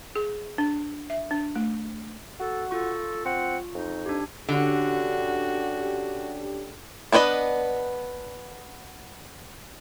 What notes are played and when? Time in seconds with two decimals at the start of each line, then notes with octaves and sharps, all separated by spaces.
0.16 G#4
0.58 D4
1.10 E5
1.31 D4
1.56 A3
2.40 F#4 A4
2.71 F4 A4 C#6
3.25 C4 F#5
3.75 F2 D#4
4.06 D4 G4
4.49 D3 C#4 D4 F#4 G4
7.12 B3 D4 B4 C#5 D#5